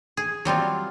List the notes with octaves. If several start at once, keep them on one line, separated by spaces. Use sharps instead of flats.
G#4
F#3 G3 C4 F4